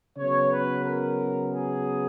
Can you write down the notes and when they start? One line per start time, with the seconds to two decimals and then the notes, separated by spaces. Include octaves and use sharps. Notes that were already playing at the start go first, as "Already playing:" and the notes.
0.17 C#3 F#3 B3 C#5
0.51 B4
0.85 A#4
1.52 G#4